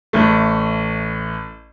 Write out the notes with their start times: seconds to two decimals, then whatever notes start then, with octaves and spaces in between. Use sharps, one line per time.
0.13 A1 A3